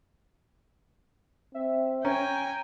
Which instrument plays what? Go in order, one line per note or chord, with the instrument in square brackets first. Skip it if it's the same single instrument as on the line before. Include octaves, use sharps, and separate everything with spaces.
[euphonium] C4 [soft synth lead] E5
[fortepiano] C#4 [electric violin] G5 G#5 [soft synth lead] A#5